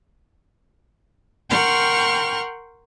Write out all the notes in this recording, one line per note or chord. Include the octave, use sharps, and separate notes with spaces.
A#4 F#5 G5 C6 C#6 F6